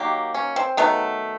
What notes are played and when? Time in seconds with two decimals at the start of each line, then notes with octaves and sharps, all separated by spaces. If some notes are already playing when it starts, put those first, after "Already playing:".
Already playing: D#3 F#3 A#3 G4
0.34 C#4
0.56 C4
0.77 D#3 F#3 A3 B3